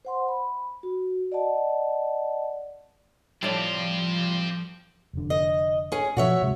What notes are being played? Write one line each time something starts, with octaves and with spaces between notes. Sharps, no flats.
C5 F#5 C6
B5
F#4
D5 D#5 F#5 A5
A2 F3 G3 C4 G4 D5 A5
F1 D3
D#5
C#4 G#4
B2 F3 F#4 C#5 E5
D2 C3 G#3